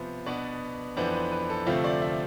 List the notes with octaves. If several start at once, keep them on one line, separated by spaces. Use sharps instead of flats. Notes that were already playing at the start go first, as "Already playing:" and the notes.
Already playing: C3 F3 B3 C5
B2 B3 D4 D5
F2 E3 B3 D4 C5
B4
B4
A4
D2 C3 F3 A3 C4 F4
D5
E5